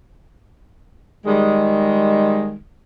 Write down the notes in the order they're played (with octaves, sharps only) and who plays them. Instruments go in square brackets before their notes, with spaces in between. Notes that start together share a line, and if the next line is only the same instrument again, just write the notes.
[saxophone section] D#3 G3 G#3